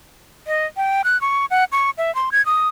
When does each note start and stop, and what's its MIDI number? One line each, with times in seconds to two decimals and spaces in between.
0.47 0.66 75
0.77 1.02 79
1.04 1.20 90
1.21 1.46 85
1.51 1.64 78
1.72 1.90 85
1.98 2.14 76
2.15 2.30 84
2.32 2.44 92
2.46 2.69 87